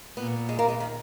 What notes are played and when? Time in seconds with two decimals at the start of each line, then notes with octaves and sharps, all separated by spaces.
0.17 A#2 B3
0.49 G#3
0.59 A#3
0.68 G#3
0.80 D#3